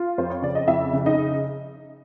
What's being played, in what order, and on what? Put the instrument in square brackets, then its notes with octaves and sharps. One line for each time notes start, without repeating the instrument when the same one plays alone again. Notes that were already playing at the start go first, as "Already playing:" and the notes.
Already playing: [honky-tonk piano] F4 F5
F2 C5
C#5
C#3 D5
D#5
F2 E4 E5
C#3
D#4 D#5